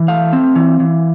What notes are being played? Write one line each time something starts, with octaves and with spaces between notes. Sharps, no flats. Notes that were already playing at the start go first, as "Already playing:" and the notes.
Already playing: E3
A3 F5
C4
E3
E3